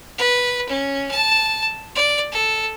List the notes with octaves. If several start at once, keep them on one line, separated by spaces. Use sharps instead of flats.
B4
C#4
A5
D5
A4